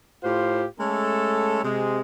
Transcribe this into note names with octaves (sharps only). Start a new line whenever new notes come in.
A2 F4 G4 C5 F5
G#3 A3 C#4 A4
C3 G#3